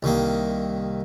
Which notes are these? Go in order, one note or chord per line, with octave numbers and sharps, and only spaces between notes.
C2 D#3 A#3